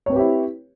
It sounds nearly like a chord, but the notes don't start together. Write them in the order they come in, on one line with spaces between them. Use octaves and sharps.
C#5 C4 B4 G4 E4